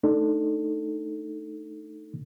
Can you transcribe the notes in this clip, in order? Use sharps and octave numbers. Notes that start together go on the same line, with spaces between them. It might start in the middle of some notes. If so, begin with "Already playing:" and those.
A3 D4 D#4 A4